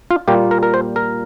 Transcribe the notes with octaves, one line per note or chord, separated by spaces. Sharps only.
F4
A#2 G3 A#3 F4 G4
A#4
A#4
C5
A#4